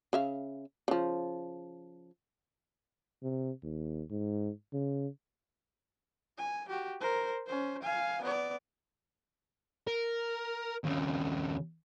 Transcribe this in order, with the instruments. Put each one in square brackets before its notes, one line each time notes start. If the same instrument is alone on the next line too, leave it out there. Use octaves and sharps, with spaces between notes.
[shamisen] C#3 E5 F5
C#3 F3
[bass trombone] C3
D#2
G#2
C#3
[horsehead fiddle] G#5
F#4 G4
A#4 C5
C#4 C5
F5 G#5
B3 D5
[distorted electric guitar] A#4
D#2 C#3